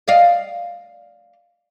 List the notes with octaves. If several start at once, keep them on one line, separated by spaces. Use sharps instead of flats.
D5 D#5 F5